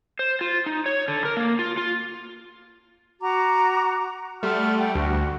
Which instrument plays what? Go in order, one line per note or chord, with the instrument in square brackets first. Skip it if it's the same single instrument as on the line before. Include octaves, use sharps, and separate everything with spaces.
[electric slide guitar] C5
F4
D#4
C#5
D3
A#4
A#3
F4
F4
[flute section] F#4 A#5 D6
[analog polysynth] G3 A3 [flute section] F#5 C6 F6
[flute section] F#5 G5
[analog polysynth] D2 [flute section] F#4